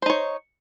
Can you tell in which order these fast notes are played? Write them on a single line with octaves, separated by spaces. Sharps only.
C5 D#4 C#5